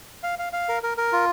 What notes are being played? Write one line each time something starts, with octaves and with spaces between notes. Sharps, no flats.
F5
F5
F5
A#4
A#4
A#4
F4